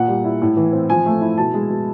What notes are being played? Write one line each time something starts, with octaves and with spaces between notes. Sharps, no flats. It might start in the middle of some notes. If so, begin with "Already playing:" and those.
Already playing: A#2 F#5
G3
E4
A2
E3
C4
F3 G#5
A3
E4
B2 A5
G#3
B2